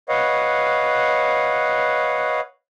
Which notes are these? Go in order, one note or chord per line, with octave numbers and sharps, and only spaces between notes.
B4 C#5 D#5 F5 F#5